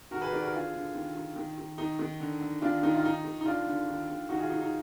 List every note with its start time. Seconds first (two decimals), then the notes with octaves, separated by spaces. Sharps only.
0.11 D#3 F#4 A#4
0.21 G#4 B4
0.32 D#3 A#4 D5
0.43 F#4 A#4
0.53 D3 F4 G#4
0.74 D3
0.95 D#3
1.16 D#3
1.36 D#3
1.58 D#3
1.78 D#3 D#4
1.99 D#3
2.20 D3
2.41 D3
2.62 D#3 D4 F4
2.83 D#3 D#4
2.95 F4
3.04 D#3 D#4
3.25 D#3
3.41 D#4
3.45 D3 D4 F4
3.66 D3
3.88 D#3
4.09 D#3
4.29 D#3 D#4 F#4
4.39 F4 G#4
4.50 D#3 D#4
4.61 D#4